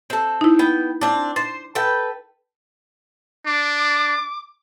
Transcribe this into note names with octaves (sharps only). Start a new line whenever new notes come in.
C4 A4
D#4 E4
B3 G5
C4 D4
C5 A6
A4 B4 G5
D4 D6